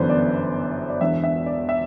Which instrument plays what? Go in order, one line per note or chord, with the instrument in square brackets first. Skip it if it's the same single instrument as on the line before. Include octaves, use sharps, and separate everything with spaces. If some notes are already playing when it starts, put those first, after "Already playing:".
Already playing: [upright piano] G1 F#2 E3 B3 D4 C5
D5
D5
E1 E2 D3 E5
E5
D5
E5